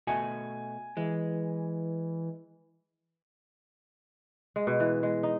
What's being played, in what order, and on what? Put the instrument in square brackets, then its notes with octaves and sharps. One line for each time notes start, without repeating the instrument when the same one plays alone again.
[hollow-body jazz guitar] B2 A3 F#4 [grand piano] G#5
[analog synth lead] E3 [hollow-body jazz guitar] G#3
[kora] G#3
B2
E3
G#3
D#4